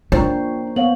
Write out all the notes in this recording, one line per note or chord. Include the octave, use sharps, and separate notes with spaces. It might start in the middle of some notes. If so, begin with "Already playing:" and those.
A#2 D4 F4 C5 C#5 G5 A#5
B3 C5 C#5 F5 F#5 F#7